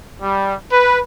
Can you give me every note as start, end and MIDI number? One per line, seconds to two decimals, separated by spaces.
0.22 0.54 55
0.71 0.99 71